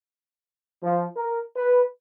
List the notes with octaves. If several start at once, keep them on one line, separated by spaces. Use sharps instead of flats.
F3
A#4
B4